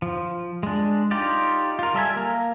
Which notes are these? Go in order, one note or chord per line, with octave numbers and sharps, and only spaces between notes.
F3
G#3 D4
D#4 F4 G4 D5
F4 A#4
G3 A4 E5 G#5
A#3 A#4 F5